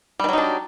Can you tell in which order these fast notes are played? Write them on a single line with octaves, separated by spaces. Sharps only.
G3 D#3 F#3 D#4 D4